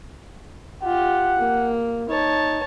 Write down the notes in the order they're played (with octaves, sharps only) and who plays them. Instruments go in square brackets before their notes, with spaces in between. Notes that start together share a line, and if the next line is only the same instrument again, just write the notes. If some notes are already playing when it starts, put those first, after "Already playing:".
[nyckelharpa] F4 G4 [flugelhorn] F#5
[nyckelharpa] A#3
[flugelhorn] D#4 [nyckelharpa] C#5 A5